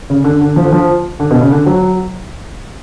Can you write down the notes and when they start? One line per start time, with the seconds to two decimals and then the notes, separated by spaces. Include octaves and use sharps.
0.10 C#3
0.24 D3
0.41 D3
0.56 F3
0.64 D3
0.72 F3
1.20 D3
1.31 B2
1.41 C#3
1.51 D3
1.66 F#3